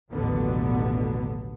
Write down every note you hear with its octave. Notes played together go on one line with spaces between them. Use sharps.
A1 D#2 B2 D3 F#3 B3